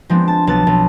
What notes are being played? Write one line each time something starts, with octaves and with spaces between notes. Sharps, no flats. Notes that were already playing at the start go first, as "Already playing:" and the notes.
F3 G#3 B3 C4 D4
A5
B1 B3 A5 A6
B1